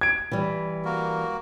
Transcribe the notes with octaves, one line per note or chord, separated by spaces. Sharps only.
G#6 D7
E3 G3
A#3 F#4 A#4